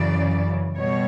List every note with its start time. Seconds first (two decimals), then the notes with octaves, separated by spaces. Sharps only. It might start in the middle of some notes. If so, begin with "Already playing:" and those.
Already playing: F#2 C#3 E3 D5
0.77 B2 G3 C#5